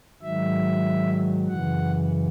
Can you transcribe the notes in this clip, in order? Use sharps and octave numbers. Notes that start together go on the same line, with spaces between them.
G#2 D#3 F#3 E5
F#2 C#3 E3 F#5